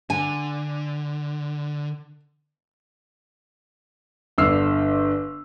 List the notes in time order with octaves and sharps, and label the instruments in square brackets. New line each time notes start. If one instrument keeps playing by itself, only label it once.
[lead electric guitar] D3 [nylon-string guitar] G#5
[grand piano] G1 D3 D4 E6 F6 C7